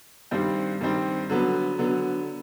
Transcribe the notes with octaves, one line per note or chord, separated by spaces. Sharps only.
G2 D#3 G3 C4
G2 D#3 G3 C4
D3 F#3 B3
D3 F#3 B3